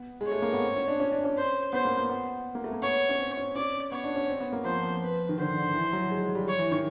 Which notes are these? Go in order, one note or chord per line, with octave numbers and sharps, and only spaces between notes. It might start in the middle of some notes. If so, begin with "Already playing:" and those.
Already playing: B3
G#3
C#5
A3
A#3
B3
C4
C#4
D4
C#4
D4
C#4
C5
B3 C5
A#3
B3
B3
A#3
A3
A#3
B3 C#5
C#4
C4
C#4
C#4 D5
B3 C#5
D4
C#4
C4
B3
A#3
F3 C5
F3
B4
D#3
D3 C5
D3
E3
F#3
G#3
G#3
G3
C#5
E3
D#3